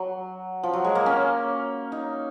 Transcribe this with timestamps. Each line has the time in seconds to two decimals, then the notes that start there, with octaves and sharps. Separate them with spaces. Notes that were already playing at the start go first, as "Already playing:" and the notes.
Already playing: F#3
0.63 F3
0.73 F#3
0.84 G#3
0.95 A#3
1.06 C#4
1.92 D#4